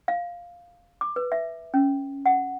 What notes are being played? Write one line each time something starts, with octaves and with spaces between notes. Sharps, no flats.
F5
D6
B4
E5
C#4
F#5